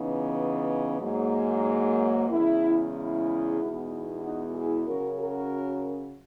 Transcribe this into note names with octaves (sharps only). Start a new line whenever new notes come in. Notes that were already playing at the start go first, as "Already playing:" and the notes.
Already playing: C#3 E3 B3 D#4
G#2 F#3 A#3
E2 C#3 G#3 E4
E4
E2 B2 G#3 D#4
D#4 F#4
E4 G#4
C#3 F#3 C#4 F#4 A#4
F#4 A#4